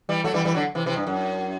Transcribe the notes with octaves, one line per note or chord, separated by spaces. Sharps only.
E3 G3
F#3 A3
E3 G3
E3 G3
D3 F#3
C3 E3
C3 E3
G2
F#2